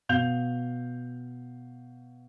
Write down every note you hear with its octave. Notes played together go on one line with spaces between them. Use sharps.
B2 F5 G6 F7